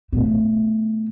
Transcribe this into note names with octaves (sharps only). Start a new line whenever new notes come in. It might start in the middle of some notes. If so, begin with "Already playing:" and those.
B2 A3